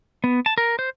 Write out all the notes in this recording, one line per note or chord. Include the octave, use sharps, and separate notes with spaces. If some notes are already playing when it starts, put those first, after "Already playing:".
B3
A5
A#4
C5